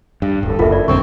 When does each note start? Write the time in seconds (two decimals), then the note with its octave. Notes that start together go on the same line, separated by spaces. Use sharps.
0.22 G2
0.43 D1 A4
0.59 F#1 F4 A#4 E5
0.72 D5
0.88 A#1 F#2 D3 C4 C#6